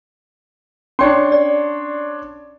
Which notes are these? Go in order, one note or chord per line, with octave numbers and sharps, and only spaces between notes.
C#4 D4 C#5 G5 C6
D5